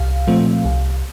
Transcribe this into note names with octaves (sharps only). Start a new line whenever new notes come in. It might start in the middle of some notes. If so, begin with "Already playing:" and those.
Already playing: C2 F5
A#2 F3 A3 C4
C2